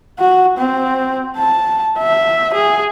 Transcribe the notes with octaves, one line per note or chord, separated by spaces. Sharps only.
F#4
C4
A5
E5
G#4